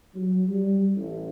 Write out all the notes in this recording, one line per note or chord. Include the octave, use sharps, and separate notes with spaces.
F#3
G3
A1